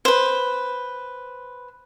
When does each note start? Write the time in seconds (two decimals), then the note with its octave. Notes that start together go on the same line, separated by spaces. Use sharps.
0.05 B4 C5